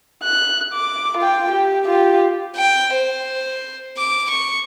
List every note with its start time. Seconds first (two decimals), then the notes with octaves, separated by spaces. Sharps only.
0.24 F#6
0.74 D6
1.18 F4 G5
1.51 G4
1.86 F4 G4
2.56 G5
2.93 C5
3.97 D6
4.30 C#6